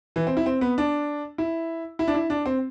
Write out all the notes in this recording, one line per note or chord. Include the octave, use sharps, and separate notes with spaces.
E3
C4
E4
C4
B3
D4
E4
E4
D4
E4
D4
C4